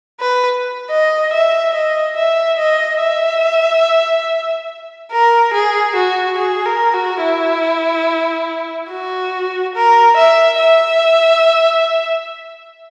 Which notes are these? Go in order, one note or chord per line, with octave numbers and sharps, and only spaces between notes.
B4
D#5
E5
D#5
E5
D#5
E5
A#4
G#4
F#4
G#4
A#4
F#4
E4
F#4
A#4
E5
E5